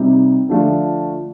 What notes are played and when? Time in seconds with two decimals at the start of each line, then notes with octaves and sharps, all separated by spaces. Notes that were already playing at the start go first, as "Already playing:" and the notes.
Already playing: C3 G3 C4 D#4 G4
0.49 D3 F3 A3 D4 F4